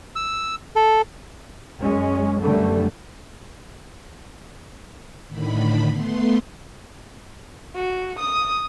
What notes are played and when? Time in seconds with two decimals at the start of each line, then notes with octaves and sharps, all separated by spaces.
0.16 E6
0.76 A4
1.79 F#2 G#3 C#4
2.42 F#2 B2 D3 G3 A3
5.28 A2 D3 D#3 B5
5.90 A3 B3 C6
7.76 F#4
8.20 D#6